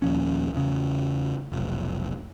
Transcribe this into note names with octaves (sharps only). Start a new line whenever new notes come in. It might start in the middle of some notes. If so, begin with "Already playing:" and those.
D#2 A#2 F3 C#4
E2 C#3
F1 B1